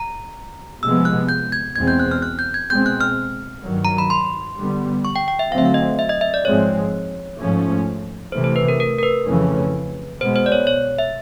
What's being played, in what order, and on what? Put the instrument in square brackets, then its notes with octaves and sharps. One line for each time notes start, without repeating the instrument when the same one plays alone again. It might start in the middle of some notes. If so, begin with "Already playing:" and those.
Already playing: [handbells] A#5
[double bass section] C3 F3 G#3 B3 [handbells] E6
[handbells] F#6
G6
G#6
[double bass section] E2 B2 G#3 C4 [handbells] G#6
[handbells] G6
F#6
F6
F#6
G6
G#6
[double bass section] B2 G#3 C4 [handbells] G6
[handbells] F#6
F6
[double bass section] G2 D#3 F#3
[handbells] A#5
B5
C6
[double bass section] D3 G3 B3
[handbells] C#6
G5
G5
E5
[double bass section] D3 F#3 A3 C4 [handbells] F5
[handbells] E5
F5
D#5
E5
D#5
E5
D5
[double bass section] G#2 F3 G#3 C4 [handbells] C#5
[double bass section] G#2 F3 A3 C#4
[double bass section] C3 E3 A3 [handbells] C5
[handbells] C5
B4
A#4
A#4
A#4
B4
[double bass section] F2 C#3 E3 A3 C#4
[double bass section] B2 G#3 B3 [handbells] C5
[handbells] C5
D5
C#5
C#5
E5